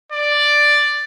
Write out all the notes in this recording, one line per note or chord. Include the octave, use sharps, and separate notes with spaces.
D5